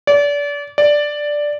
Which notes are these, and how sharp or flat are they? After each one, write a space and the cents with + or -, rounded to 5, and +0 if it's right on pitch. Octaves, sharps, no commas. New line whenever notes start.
D5 -30
D5 +0